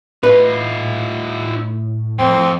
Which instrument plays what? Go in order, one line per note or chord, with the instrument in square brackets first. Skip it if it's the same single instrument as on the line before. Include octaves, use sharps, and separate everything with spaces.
[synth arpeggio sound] A2 [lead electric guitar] D#4 F4 [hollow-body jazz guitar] B4
[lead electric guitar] F2 [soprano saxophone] C4